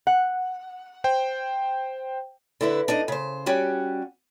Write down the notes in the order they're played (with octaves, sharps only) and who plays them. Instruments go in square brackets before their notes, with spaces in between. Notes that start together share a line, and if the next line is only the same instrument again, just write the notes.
[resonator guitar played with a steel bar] F#5
[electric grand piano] C5 G5
[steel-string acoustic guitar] D3 E4 B4
D4 D#4 D#5
C#3 C5
G3 C#4 F#4 G4